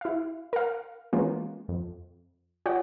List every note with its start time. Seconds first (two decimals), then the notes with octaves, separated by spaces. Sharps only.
0.01 E4 F5
0.53 A#4 F5
1.13 E3 G#3 A#3 B3 C#4 F4
1.68 F2
2.66 F4 C#5 D5 F#5 G5